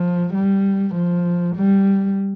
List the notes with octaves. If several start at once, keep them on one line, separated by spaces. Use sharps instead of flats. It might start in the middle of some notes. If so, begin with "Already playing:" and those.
Already playing: F3
G3
F3
G3